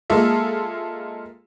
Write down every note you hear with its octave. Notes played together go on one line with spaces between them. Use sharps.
G#3 A#3 F4 G#4 A4 E5